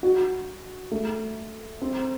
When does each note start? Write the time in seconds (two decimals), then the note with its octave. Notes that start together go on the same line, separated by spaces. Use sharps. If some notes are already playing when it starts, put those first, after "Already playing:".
0.03 F#4
0.91 A3
1.82 C4